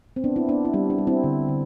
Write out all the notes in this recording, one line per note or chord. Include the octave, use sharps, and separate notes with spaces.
C4
B3 D4
C4 E4
B3 D4
E4
G3 D4
D4
G3
C4 E4
D3
D3